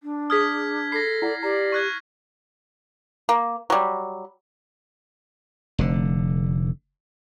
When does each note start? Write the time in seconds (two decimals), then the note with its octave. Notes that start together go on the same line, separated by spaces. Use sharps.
0.03 D4
0.30 G#4 D#6 F6 G#6 B6
0.92 A4 B5 A#6 C7
1.22 E4 D5 F#5
1.43 G4 D5 A#5
1.72 C#6 F#6 G#6
3.29 A#3
3.70 F#3 G3
5.79 F1 D3